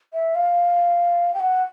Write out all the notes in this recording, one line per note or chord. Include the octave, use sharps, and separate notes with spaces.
E5
F5
G5
F#5